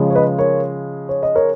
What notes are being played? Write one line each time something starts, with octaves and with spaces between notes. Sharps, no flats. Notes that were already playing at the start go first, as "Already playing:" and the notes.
Already playing: C#3 F3 G#3
C#5
B4 D#5
A#4 C#5
C#5
D#5
A#4 C#5